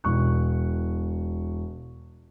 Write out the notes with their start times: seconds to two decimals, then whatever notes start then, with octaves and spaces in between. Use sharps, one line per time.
0.04 E1 C#6 F#6